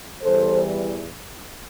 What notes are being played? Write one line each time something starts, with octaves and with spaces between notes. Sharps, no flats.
E2 E3 G3 A4 C5